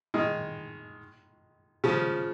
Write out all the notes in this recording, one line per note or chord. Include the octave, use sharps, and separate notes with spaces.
D#3 G#3
C#3 F3